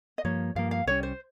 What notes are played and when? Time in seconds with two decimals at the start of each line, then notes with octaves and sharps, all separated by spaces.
0.18 D#5
0.25 G2 F3 A#3 C#5
0.56 G2 F3 A#3 F5
0.71 F5
0.86 C2 C3 G3 C#4 C#5
1.03 C5